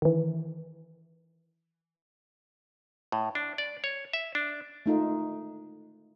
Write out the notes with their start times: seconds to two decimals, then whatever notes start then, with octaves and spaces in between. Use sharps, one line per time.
0.02 D#3 E3
3.12 A2
3.35 D4
3.58 D5
3.84 C#5
4.13 E5
4.35 D4
4.86 A3 D#4 F4